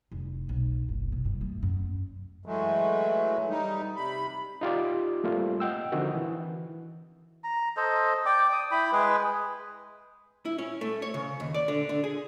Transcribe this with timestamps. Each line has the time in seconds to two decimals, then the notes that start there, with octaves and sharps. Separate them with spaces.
0.12 F1
0.49 B1
0.89 F#1
1.12 C3
1.25 G2
1.41 A3
1.63 F#2
2.46 E3 F#3 G#3 A3
3.49 G3 D#4
3.96 C3 B5
4.61 D#4 F4 G4 D5
5.24 G3 A3 A#3 C4 F4
5.60 D#5 F#5 G5 E6
5.92 D3 F3 C4 D#4 F#4 A#4
6.15 E3
7.44 A#5
7.77 A4 C5 D#5
8.26 D5 G5 D6
8.53 D#6
8.71 E4 G5 B5
8.92 G#3 G#4 B4
10.45 E4
10.58 C#4
10.81 A3
11.02 C#5
11.14 C#3
11.40 D#2
11.54 D5
11.68 D3
11.89 D3
12.04 G#4